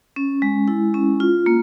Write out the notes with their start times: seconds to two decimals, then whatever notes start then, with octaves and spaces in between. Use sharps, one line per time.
0.16 C#4
0.42 G#3
0.68 E4
0.94 C#4
1.20 F4
1.46 A#3